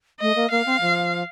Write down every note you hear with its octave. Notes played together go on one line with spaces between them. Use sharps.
A3 D#5
A#3
A#3 F5
C4
F3